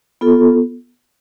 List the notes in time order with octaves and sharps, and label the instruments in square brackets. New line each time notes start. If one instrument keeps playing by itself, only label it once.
[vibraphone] B3 F4 A4